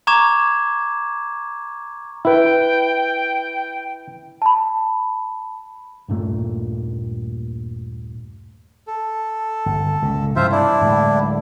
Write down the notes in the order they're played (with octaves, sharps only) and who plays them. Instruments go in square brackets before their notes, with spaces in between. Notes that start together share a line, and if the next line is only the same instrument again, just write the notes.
[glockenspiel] A#5 C#6 D6 G#6 E7
[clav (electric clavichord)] E4 B4 [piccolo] G5
[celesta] A5 B5
[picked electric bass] D#1 G2 A#2 A3
[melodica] A4
[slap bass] G1
C#2 A#2
[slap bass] G2 C3 E3 [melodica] F4 C5 E5
[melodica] D4 E4
[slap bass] D1 A2 G#3